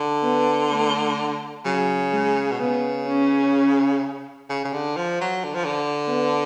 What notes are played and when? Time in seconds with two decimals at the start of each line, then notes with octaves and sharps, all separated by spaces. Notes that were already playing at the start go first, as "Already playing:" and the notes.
Already playing: D3
0.23 B3
0.70 A3
1.65 C#3 F#3
2.13 G#3
2.52 B2
2.60 C#3 B3
3.07 C#4
4.49 C#3
4.65 C#3
4.73 D3
4.97 F3
5.21 F#3
5.44 D3
5.55 F3
5.65 D3
6.08 B3